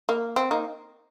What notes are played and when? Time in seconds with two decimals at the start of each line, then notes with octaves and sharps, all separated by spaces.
0.09 A#3
0.36 C4
0.51 A#3 D#4